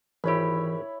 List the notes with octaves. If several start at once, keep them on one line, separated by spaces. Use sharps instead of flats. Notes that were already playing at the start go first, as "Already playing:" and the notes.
G#1 E3 E4 G4 C#5 B5